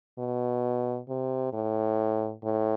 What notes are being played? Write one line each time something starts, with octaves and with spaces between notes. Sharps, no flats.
B2
C3
A2
A2